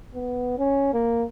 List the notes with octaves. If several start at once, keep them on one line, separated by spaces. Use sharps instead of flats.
B3
C#4
A#3